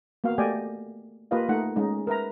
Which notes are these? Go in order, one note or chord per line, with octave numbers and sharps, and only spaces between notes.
A#3 B3 F#4 F5
A3 G4 D5 D#5 G5 G#5
A#3 F4 G4 B4 D#5 F5
A3 D#4 F#5
G#3 C#4 D#4
A#4 B4 E5 A#5